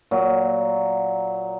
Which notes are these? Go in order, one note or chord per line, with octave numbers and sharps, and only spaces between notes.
A#2 F#3